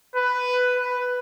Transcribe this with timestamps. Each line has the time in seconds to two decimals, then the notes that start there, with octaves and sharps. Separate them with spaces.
0.15 B4
0.77 B4